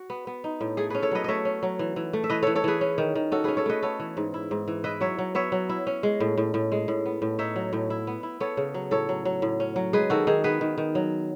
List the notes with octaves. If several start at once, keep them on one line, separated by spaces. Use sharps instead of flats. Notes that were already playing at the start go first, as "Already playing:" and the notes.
Already playing: F#4
B3
B3
D#4
A2
A3 G#4
C#4 G#4 B4
A4 C#5
F#3 B4 D#5
A3 C#5 D#5 E5
C#4
F#3
E3
E3
A3
E5
E3 B4 D#5
E3 A4 C#5
A4 C#5
E3 G#4 B4
C#4
D#3
D#3
C#4 F#4 A4
C#4 G#4 B4
A4 C#5
A3 B4 D#5
B3 A4 C#5
E3
G#2
E4
G#2
E3
E4 B4 D#5
F#3 C#5 E5
F#3
B3 C#5 E5
F#3
E4
C#4
G#3
A2
A2
A2
G#3
A2
B3
A2
D#4 C#5 E5
F#3
A2
E4
B3
E4
B3 A4 C#5
C#3
F#3
A2 A4 C#5
F#3
F#3
A2
C#4
F#3
G#3 G#4 B4
D#3 F#4 A4
D#3 G#4
B3 G#4 B4
D#3
D#3
F#3